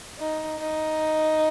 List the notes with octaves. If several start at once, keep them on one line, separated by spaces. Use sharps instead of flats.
D#4
D#4